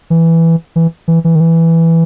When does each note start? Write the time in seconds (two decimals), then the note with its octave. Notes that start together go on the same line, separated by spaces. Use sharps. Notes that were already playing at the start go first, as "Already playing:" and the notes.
0.10 E3
0.76 E3
1.08 E3
1.24 E3
1.35 D#3
1.40 E3